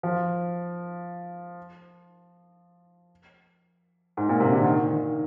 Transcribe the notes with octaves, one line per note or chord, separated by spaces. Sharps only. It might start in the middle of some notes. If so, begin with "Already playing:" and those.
F3
G#2
A#2
C3
D3
D#3
D#3